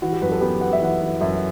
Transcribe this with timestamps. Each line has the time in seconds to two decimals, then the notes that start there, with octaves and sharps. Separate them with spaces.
0.02 E3 F#4
0.12 G4
0.22 F#2 B4
0.31 A4
0.41 B3 G4
0.61 B3 F#5
0.73 E5
0.81 E3 F#5
1.02 E3
1.21 F#2 E5